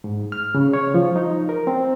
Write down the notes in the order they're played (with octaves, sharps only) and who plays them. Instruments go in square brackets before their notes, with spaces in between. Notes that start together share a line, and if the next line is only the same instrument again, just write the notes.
[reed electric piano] G#2
F6
C#3
C#5
F3
D#4
A#4
C4